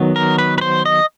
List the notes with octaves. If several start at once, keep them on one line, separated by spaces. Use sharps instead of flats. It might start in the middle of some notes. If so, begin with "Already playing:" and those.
Already playing: D#3 F#3 B3
A#4
B4
B4
C5
D#5